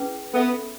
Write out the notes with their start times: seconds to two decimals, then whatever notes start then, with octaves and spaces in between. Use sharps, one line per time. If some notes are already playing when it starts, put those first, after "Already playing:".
Already playing: C#4 E4 G#4 B4
0.34 B3 A4 E5 B5